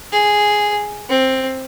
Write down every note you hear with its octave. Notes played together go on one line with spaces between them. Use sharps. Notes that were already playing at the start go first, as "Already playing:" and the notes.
G#4
C4